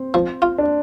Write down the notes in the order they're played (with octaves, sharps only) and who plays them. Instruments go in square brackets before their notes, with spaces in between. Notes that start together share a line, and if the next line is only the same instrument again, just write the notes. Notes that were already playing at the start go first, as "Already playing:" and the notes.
Already playing: [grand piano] C4
[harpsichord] F3
F4
[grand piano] D4